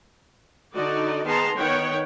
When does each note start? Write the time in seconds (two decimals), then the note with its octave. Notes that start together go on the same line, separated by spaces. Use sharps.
0.75 D3 D#4 F#4 D5 D#5
1.24 D#3 B3 G#4 A5 A#5 C6
1.57 D#3 B3 C#5 F#5 G5